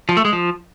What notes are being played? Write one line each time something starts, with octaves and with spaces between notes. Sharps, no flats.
F3
A3
G#3
F3